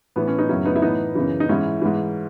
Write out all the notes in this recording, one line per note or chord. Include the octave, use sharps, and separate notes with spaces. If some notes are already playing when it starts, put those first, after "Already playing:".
A2 E3 B3
C#4
B3 D#4
F#2 C#3 F#3 C#4 E4
B3 D#4
E4
A2 E3 B3 D#4
F#2 C#3 E3
D#4
G#2 E3 C#4 E4
G#2 E3